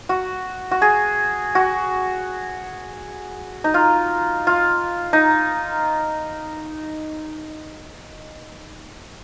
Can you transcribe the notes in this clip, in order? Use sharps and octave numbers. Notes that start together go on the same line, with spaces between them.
F#4
F#4
G#4
F#4
D#4
F4
F4
D#4